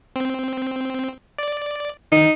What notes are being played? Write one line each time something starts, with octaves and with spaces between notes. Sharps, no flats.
C4
D5
D#3 D#4